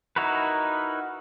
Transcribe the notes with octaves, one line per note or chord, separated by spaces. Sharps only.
D#4 E4 F#4 A#4 B4